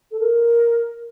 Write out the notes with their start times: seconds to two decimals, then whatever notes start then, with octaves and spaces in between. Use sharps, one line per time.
0.11 A4
0.20 A#4